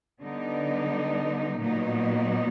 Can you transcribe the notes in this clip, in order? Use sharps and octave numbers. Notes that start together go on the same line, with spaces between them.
D3 G3 B3 D#4
A#2 F#3 B3 D#4